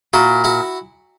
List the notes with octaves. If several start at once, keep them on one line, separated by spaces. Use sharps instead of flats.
A#2 E4 F#4
E4 F#4